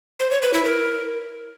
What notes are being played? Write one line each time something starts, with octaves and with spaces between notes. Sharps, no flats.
C5
C#5
B4
E4
A#4